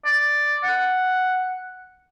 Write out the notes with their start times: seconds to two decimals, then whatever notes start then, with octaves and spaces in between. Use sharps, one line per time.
0.05 D5
0.64 F#5